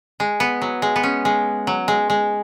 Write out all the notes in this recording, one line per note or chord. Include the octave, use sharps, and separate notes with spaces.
G#3
B3
F#3
G#3
B3
C#4
G#3
F#3
G#3
G#3